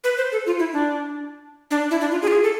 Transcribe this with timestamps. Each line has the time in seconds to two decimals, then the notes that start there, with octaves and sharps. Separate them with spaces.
0.04 B4
0.18 C5
0.32 A4
0.46 F4
0.59 E4
0.73 D4
1.71 D4
1.91 E4
2.01 D4
2.11 F4
2.22 G#4
2.28 F4
2.32 G#4
2.43 A4